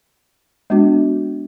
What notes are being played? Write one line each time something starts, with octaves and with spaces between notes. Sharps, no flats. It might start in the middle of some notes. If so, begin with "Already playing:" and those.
G#3 B3 D4 F#4